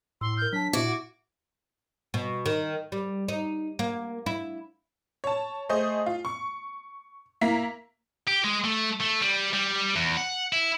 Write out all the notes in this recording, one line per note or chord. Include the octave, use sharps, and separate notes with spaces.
A2 C6 E6
A#4 F6 G6
F#3 D4 A5 B6
A#2 E4 F#4 E5 D6 G#6
B2
D#3
G3
D#4
A#3
E4
C#5 A5
A3 G#4 C5 D#5
F4
C#6
A#3 E4 A#5 B6
G4
G#3
A3
A3
G3
G3
E2
F#5
E4